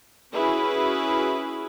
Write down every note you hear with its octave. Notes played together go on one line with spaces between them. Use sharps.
C#4 E4 F#4 G#4 B4